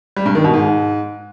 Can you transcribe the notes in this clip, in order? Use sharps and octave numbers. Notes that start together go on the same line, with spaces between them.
G3
G2
D#3
B2
G#2